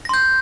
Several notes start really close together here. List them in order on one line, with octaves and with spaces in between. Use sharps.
A#6 C6 G6